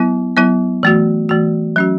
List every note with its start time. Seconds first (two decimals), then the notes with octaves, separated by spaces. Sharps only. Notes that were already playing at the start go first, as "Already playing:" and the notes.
Already playing: F#3 B3 E4
0.37 F#3 B3 E4
0.83 E3 A3 F#4
1.29 E3 A3 F#4
1.76 F#3 C#4 F#4